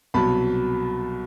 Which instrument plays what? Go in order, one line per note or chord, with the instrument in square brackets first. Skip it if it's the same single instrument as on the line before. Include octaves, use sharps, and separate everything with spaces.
[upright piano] C2 B2 F#3 A5 B5